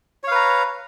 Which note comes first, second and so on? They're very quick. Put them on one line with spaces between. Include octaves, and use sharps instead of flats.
C#5 F5 B4 A#5